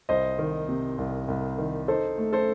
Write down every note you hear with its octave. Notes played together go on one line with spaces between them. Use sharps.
C2 C5 D#5
D#3
C3
C2
C2
D#3
D#4 A4 C5
A3
A4 C5